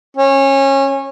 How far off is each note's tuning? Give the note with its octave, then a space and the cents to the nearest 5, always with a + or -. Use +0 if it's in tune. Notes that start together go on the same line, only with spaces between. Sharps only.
C#4 -25